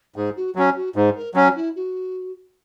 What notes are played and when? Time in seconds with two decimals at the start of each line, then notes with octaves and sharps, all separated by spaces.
0.15 G#2 G#4
0.36 F#4
0.55 F#3 C#4 F#4
0.75 F#4
0.95 G#2 G#4
1.15 A#4
1.34 F#3 C#4 F#4
1.55 E4
1.75 F#4